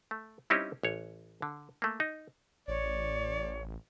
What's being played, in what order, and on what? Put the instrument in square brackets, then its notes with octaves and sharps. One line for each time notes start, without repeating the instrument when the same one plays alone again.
[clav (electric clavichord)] A3
G3 C4 C#4 D#4 E4 G4
A1 C#5
D3
A3 A#3
D#4
[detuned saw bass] A1 [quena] C#5 [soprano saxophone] D5